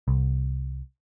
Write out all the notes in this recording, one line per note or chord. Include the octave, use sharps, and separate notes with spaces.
C2